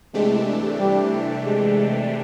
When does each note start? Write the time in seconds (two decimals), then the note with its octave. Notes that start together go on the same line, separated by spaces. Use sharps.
0.14 C3 E3 G#3 A3 D4 G4
0.79 G3
1.44 G#3